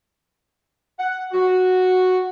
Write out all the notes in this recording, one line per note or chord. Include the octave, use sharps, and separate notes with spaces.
F#5
F#4